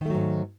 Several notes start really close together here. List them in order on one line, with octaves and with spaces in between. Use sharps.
D#3 A3 F#3 G#2